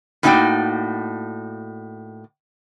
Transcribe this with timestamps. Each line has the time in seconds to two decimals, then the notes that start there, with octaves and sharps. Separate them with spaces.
0.23 A2 A#3 D#4 F#4 D5 G5